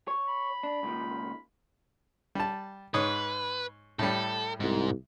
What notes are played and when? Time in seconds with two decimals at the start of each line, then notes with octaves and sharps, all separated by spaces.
0.08 C#5
0.29 B5
0.63 D4
0.83 C#2 A#2 D#3
2.35 G3 A5
2.94 G#2 B4 C#5 D#6
3.99 A2 G3 A4
4.60 C2 G#2